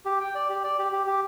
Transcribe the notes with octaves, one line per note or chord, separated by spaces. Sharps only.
G4
G5
D5
G4
D5
G4
G4
G4